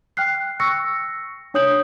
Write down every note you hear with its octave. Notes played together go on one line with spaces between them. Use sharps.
G5 F6 F#6 C7
C#6 E6 A#6 C#7
D4 C#5 D#6 G6 F#7